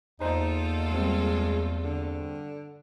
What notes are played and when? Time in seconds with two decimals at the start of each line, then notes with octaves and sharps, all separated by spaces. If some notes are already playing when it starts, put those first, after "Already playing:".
0.20 E2 A#3 D#4 F4 A4 C5 A#5
0.91 G2 G#3 C4
1.84 D3